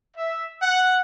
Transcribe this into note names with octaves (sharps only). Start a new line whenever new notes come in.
E5
F#5